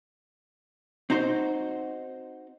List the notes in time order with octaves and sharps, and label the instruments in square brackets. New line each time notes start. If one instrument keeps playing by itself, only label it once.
[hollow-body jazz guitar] C4 D#4 F#4 C5